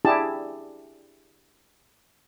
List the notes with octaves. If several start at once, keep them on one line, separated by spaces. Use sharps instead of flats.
D4 E4 G4 G#4 A5